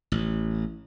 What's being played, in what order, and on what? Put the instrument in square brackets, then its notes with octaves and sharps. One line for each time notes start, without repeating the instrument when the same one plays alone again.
[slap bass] A1